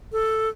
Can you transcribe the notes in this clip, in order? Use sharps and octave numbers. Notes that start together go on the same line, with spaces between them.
A4